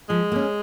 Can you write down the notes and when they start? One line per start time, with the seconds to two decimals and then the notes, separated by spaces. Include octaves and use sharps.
0.09 F3 G#3
0.32 A#3 C#4